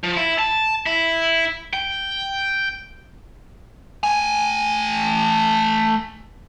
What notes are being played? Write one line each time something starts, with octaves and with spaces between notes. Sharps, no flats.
F3
E4
A5
E4
G5
A3 G#5